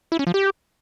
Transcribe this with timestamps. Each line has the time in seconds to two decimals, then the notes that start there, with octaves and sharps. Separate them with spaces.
0.12 E4
0.19 C#4
0.27 F3
0.34 G4